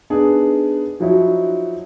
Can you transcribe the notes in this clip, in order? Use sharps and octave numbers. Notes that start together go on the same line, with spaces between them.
B3 D4 D#4 G#4
F3 F#3 D#4 E4 F#4 C#5